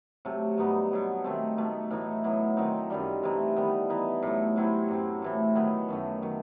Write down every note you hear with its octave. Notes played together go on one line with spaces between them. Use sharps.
C3 F#3 A3
G2 F#3 B3 D#4
B2 F#3 B3
D#3 A3 C4
B2 A3 D#4
A2 E3 A3 D#4
A2 F#3 B3
D#3 F#3 C4 D#4
F#2 D#3 G3
C3 E3 A3 D#4
D#3 G3 B3
E3 B3 D#4
A2 F#3 A3
C3 F#3 C4 E4
F#2 F#3 C4
A2 E3 A3
D#3 F#3 B3 E4
F#2 D#3 A3
D#3 F#3